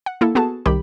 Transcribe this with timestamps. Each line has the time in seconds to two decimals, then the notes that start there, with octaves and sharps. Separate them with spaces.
0.06 F#5
0.21 A#3 E4 A4
0.35 B3 F#4 G#4 A4 A5
0.66 C2 D#3 G4 B5